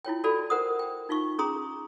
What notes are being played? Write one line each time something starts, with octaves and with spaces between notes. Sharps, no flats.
E4 F4 C#5 G5
F#4 A4 D5 F5 G#5 B5
A#4 C5 F#5 D#6
G5
D#4 F4 F5 C#6
C#4 G#4 A#5 C6 D#6